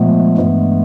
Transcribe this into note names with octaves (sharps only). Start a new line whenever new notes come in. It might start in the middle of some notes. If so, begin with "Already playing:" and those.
Already playing: A#2 F3 G#3 A3 B3
G2 E3 G#3